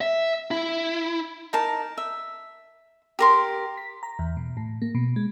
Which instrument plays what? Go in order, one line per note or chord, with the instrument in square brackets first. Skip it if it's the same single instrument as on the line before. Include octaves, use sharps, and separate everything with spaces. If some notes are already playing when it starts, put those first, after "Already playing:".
[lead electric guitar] E5
E4
[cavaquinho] D#4 A#4 A5
E5
G4 A#4 C6
[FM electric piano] B6
A#5
E2
B2
A2
A#3
B2
G#3